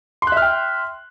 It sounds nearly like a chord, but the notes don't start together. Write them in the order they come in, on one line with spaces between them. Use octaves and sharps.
C6 F#6 E5 F6 G5